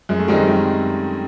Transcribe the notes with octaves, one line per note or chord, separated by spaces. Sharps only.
F#2 G#3
A3
D#3 G3 G#3 C4 D#4
F#2